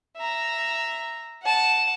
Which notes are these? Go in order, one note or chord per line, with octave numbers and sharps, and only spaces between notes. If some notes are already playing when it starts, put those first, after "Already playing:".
E5 A#5
F#5 A5